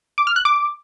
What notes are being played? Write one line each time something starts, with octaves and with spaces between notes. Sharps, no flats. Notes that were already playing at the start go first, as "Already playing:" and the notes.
D6
F6
F#6
D6